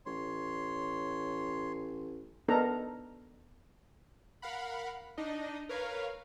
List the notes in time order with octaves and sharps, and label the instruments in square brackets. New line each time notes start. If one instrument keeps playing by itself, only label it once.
[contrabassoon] A1 [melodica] C#5 C6
[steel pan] B3 D4 D#4 A4 A#4 A#5
[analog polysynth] A#4 F5 F#5 B5
D4 D#4 D#5
A#4 B4 C#5 F5